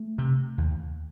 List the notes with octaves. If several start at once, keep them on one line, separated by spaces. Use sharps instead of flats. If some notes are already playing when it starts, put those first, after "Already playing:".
Already playing: A3
C3
D#2